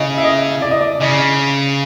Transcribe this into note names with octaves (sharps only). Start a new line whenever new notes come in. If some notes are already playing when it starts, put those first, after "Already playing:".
Already playing: C#3 D#5
E5
D#5
D5
D#5
D5
C#3 D#5